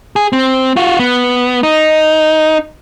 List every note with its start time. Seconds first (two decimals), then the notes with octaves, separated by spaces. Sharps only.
0.16 G#4
0.33 C4
0.76 F4 F#4
0.99 B3
1.63 D#4